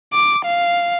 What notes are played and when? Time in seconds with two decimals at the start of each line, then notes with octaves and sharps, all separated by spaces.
0.13 D6
0.45 F5